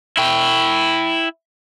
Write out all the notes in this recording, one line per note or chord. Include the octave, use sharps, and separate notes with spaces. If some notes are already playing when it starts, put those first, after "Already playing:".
E4 G5